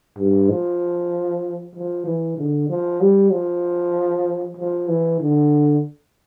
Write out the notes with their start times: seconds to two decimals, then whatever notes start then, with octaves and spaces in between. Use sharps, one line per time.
0.18 G2
0.50 F3
1.76 F3
2.06 E3
2.37 D3
2.69 F3
3.01 G3
3.32 F3
4.57 F3
4.88 E3
5.20 D3